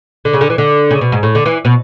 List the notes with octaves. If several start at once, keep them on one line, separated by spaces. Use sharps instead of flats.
D3
C#3
D3
E3
D3
C#3
B2
G#2
A2
D3
E3
B2